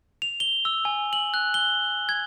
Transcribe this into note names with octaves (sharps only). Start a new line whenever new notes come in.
F7
G7
E6
G#5
F#7
F#6
G7
G#6